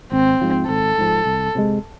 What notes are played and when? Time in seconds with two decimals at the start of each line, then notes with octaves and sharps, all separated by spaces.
0.12 G#1 C4
0.41 G#2 F3
0.69 G#1 A4
0.98 G#2 F3
1.25 C2
1.55 C3 F3 G#3